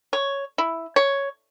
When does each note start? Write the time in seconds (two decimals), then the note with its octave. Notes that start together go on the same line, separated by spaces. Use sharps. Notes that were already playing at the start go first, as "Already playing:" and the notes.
0.13 C#5
0.58 E4
0.96 C#5